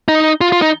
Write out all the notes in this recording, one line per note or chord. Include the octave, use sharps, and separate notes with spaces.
D#4
F4
F4
D#4